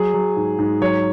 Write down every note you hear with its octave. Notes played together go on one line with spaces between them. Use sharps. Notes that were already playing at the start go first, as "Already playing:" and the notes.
Already playing: F#3 G#4
F#3
G#2
G#2
F#3 C#5